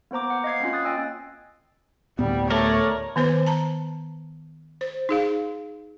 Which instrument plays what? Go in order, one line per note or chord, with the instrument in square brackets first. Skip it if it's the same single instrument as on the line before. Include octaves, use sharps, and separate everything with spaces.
[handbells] A#3 B3 C5 A#5 D6
F#5
D#5 F5 G#6 C7
A#3 C4 C#4 F4
D#6 F#6 A6
D#5 G5 G#5 E6
[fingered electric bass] D2 A2 B3 [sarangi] G3
[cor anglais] A3 [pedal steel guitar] A#4 D5 [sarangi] C#5
[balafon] D#3 B3 B4 C5
A5 A#5
C5
D#4 G#4 F5